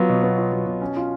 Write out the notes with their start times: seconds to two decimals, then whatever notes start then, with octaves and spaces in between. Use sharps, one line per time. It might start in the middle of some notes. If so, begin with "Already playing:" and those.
Already playing: F#3 B3 F4
0.09 B2
0.23 B3
0.38 F4
0.52 F#3
0.66 B2
0.81 C#4
0.96 F4